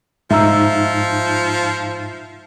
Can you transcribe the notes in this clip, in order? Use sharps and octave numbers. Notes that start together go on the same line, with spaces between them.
G#2 F3 D#4 E5 A#5 E6